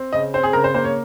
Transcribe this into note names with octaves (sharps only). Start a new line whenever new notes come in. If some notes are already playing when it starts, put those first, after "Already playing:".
Already playing: C4
C#3 D#5
C4 C5
G#4
C#3 A#4
C5
A#3 C5
C#5